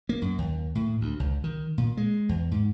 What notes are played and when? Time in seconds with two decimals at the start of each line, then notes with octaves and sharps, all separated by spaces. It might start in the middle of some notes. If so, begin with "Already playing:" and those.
0.09 A#3
0.22 F#2
0.38 D#2
0.75 A2
1.01 D2
1.20 C#2
1.44 D#3
1.78 A#2
1.97 G#3
2.29 E2
2.51 G#2